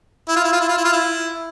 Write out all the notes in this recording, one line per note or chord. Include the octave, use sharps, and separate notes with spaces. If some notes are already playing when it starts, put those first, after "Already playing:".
E4
F4
E4
F4
E4
F4
E4
F4
E4